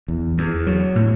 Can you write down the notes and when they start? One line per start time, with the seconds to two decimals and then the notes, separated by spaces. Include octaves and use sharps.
0.08 E2
0.38 E2
0.67 F#3
0.95 A2